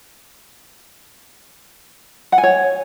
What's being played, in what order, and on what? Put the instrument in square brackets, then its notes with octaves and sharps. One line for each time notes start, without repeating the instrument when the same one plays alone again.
[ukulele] F#5
G#5
C#5